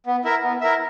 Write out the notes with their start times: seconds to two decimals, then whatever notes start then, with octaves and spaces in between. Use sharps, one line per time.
0.06 B3
0.25 E4 A#4 E5
0.43 B3
0.61 E4 A#4 E5